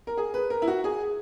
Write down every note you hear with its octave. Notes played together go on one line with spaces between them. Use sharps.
A#4
G#4
B4
A#4
E4
F#4
G#4